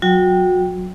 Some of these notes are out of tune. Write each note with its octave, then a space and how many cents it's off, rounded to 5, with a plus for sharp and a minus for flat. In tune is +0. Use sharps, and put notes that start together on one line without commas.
F#3 +0 F#4 -30 G5 +0